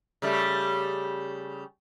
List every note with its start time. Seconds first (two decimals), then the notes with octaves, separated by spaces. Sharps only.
0.22 C#3 G3 A3